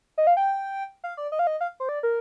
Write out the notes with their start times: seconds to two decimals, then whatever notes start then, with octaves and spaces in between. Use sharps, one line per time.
0.18 D#5
0.27 F5
0.37 G5
1.04 F5
1.17 D5
1.32 D#5
1.39 F5
1.47 D#5
1.61 F5
1.80 C5
1.89 D5
2.03 A#4